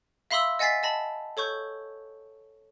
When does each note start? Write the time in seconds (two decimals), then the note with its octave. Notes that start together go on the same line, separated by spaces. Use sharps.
0.31 E5 F5 B5 C6 D#6 E6
0.59 D#5 F#5 G#5 A6 B6 C7
0.83 D#5 A5 B5
1.37 A4 C#5 C#6 G6